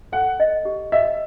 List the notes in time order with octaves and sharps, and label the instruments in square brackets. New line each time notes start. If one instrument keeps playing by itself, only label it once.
[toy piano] A4 [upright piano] F#5
[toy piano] D#5
G4
[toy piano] D#5 [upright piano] E5